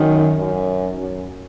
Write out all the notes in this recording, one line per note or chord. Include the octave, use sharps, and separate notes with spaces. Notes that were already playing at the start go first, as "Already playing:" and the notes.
Already playing: F#2 D#3
F#2
F#2